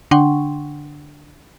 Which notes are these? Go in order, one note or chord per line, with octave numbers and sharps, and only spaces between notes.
D3 D4 F#5 G5 C6 C#6